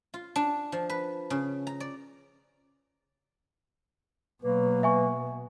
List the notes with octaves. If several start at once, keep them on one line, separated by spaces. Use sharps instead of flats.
F4
D4
F3
B4
C#3
A#5
D5
B2 F#3 A#3 B4
E5 G#5 C#6